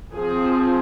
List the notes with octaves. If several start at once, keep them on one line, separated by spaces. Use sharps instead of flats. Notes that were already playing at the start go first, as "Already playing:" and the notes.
F3 C4 G#4